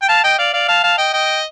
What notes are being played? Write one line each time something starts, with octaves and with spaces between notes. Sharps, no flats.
G5
F5 A5
D#5 G5
D5 F5
D5 F5
F5 A5
F5 A5
D#5 G5
D#5 G5